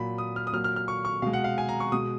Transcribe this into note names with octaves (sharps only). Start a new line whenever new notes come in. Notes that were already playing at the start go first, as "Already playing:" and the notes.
Already playing: A#2 F#3 B5
D#6
F6
D#6
A#2 F#3 F6
F6
F6
C#6
C#6
B2 G#3 F5
F#5
F5
G#5
A#5
C#6
B2 G#3 D#6